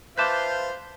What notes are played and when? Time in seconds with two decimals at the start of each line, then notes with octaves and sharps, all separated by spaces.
0.18 F4 B4 C5 E5 A5 D6 F#6 G6